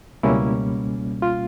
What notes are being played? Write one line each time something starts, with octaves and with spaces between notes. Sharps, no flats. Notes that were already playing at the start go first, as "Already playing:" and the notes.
C#2 B2 G3 A#3 C#4 E4
F4